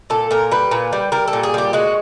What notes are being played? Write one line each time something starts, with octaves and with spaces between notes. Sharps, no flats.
A#2 A4
A#2 A#4
G3 B4
A#2
G3
G3 A#4
A4
A#2
G#4
G3 G4
G#3 F#4